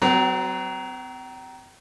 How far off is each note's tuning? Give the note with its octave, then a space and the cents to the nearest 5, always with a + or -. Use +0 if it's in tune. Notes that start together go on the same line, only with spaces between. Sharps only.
F#3 +20 C4 -40